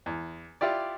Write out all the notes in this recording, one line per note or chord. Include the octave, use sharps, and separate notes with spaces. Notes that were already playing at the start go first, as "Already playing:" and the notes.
E2
E4 F4 G4 D5